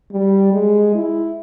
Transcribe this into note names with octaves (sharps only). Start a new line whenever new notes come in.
G3
G#3
E4